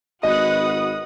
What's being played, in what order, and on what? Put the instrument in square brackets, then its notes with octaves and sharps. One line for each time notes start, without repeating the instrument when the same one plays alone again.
[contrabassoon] G#1 [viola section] F#4 B4 F#5 [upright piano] D#5 [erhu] D#6